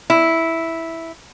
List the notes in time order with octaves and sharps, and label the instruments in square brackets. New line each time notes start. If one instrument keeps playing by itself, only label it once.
[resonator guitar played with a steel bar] E4